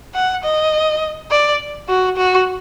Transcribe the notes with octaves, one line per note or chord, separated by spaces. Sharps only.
F#5
D#5
D5
F#4
F#4